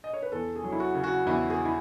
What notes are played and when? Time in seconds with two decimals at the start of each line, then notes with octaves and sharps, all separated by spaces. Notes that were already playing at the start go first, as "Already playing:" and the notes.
0.04 D#5
0.13 C#5
0.22 B4
0.32 E2 A4
0.56 G#4
0.64 F#3
0.72 E4
0.80 F#4
0.95 C#3
1.04 F#4
1.26 E2 E4
1.50 G#4
1.65 E4